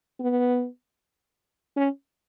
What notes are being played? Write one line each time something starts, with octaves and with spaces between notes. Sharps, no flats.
B3
C#4